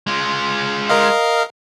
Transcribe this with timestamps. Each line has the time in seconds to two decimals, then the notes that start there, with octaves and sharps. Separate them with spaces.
0.07 G#3 F4
0.89 A#4 D#5 F5